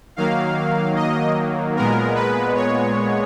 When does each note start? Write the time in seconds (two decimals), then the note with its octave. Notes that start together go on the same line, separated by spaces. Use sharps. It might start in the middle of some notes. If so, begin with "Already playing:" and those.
0.16 D#3 F#3 A#3 F5
0.96 D#5
1.76 A#2 G#3 B3 A#4
2.15 B4
2.55 C#5